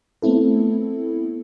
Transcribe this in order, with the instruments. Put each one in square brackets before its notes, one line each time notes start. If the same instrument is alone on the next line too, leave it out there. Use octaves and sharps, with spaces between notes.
[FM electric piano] A3 B3 C4 E4 A4